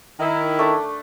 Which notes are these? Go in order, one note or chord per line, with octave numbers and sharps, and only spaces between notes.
D#3 E4
A3 D4